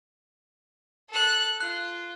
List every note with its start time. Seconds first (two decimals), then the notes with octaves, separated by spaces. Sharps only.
1.10 A4 F#6
1.60 F4 F#6